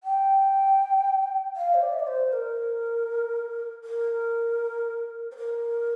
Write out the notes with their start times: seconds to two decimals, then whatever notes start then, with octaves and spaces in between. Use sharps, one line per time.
0.04 G5
1.56 F5
1.74 C5
1.81 D5
1.93 E5
2.00 D5
2.07 C5
2.33 A#4
3.84 A#4
5.32 C5
5.37 A#4